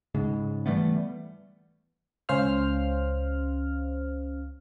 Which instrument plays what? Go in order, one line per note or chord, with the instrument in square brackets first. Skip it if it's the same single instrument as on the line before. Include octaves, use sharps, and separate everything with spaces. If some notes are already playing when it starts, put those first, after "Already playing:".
[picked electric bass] G#2 C#3 G#3
E3 G3 A3 B3
[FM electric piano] C#2 C#4 C5 F5 F6